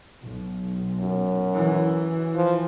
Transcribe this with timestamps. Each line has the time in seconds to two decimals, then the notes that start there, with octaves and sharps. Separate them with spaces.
0.22 B1
1.00 F#2
1.54 E3
2.35 F3